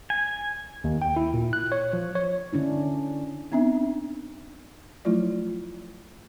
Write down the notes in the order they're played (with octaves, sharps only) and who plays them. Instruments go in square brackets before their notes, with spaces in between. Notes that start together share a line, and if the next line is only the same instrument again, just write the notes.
[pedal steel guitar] G#5
[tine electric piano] D#2
G5
E4
A#2
F#6
C#5
F3
C#5
[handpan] D3 C#4 D4 E4
[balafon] B3 C4 D4 D#4 E5
F3 F#3 A3 E4 F4 D5